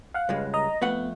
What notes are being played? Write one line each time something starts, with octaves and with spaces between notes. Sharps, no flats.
F5 F#5
C#2 G2 G#3
D#5 A#5
F2 A3 B3 F#5